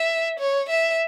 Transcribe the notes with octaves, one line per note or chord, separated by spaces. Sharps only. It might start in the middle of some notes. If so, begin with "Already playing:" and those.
Already playing: E5
C#5
E5